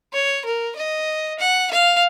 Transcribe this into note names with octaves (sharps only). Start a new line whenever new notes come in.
C#5
A#4
D#5
F#5
F5